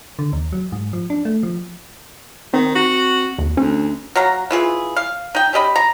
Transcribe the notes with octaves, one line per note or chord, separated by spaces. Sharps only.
D3
D#2
F#3
G#2
F3
D4
A3
F3
D#3 C4
F#4
D#2
D2 C#4
F#3 F5 A#5
E3 F4 G#4
F5
D#4 G5
C#4 G4 D#5 B5
A#5